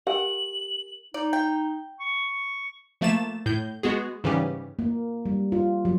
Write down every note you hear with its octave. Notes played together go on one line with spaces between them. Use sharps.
G4 A#4 F#5 G#5 F#7
D#4 D5
G5
C#6
F3 A3 A#3 A6 E7
A2 G6
G#3 B3 F#4 G#4
G#2 C#3 E3 G3 C#4 G4
A#3
G3
F4
F#3